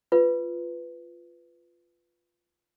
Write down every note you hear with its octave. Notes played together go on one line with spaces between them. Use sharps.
F4 B4